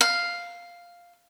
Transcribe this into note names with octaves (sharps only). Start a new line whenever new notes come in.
F5